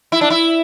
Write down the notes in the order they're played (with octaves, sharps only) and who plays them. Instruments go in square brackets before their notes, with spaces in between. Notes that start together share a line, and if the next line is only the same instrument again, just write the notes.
[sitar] E4
D4
E4